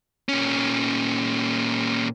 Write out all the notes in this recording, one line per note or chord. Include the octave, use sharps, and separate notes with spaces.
A#2 C#4